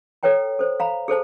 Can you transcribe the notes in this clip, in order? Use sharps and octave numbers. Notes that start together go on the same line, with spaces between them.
A4 B4 C#5 G5 A#5
A4 C5
F5 A#5 B5
G#4 A4 C5 A5